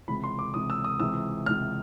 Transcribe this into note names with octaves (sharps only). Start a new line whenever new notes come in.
C#2 C3 E3 B5
C6
D6
C#2 C3 E3 D#6
E6
D#6
C#2 C3 E3 E6
C#2 C3 E3 F6